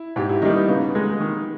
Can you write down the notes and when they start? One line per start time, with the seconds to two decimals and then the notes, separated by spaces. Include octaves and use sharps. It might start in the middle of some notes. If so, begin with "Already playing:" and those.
Already playing: E4
0.16 G#2 G4
0.29 E4
0.42 D#3 G3 D#4
0.56 B3
0.68 C#3 B3
0.95 G#3 D#4
1.20 D#3